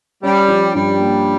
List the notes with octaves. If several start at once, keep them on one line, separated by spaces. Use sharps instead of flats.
G3 C#4
F3
G2 G3
A#3